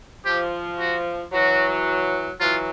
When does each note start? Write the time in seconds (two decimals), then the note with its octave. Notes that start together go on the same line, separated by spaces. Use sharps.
0.25 F3 G4
0.79 F#4
1.32 E3 F#3 F#4
2.40 E3 F#3 F4